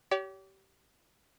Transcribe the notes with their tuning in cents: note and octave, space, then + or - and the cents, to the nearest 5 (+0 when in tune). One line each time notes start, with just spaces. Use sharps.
G4 -25 C#5 +35